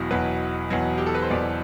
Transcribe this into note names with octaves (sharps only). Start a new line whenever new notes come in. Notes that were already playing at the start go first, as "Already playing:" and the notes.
Already playing: E1 E2 B2 F#3
E1 E2 B2 F#3 B4
E1 E2 B2 F#3
G4
A4
B4
C5
E1 E2 B2 F#3 D5